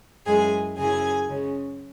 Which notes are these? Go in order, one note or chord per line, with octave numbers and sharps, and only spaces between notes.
F#2 E3 G#3 G#4 G#5
F#2 C#3 F#3 C#4 E4 G#4 G#5
C#3 G#3 C#4